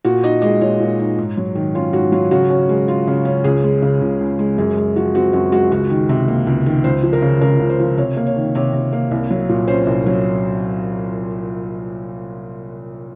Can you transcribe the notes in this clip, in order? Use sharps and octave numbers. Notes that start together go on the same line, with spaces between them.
A#2 F#4
D#4 D#5
G#3 D#5
A#2 C#5
A#2
D#4
G#2
F#3
D#3
C#4 F4
G#2 F#4
F#3 F4
C#3 F#4
C#4
G#3
F4
C#3
C#4
C#2 G#4
G#3
C#3
C#2
C#2
G#3
F#2 G#4
G#3
F3 F#4
C4 F#4
F#2 F#4
G#3 F#4
C#2 F#4
D#3
C3
A#3
C#2
D#3
C#2 C5
F3
A#4
C#3
C#2 A#4
C#2
C5
F3
C3 C#5
A#3
C#5
D#3
C3 C#5
C3
A#3
C2
F#3
A#2
C#4 C5
C2
F#3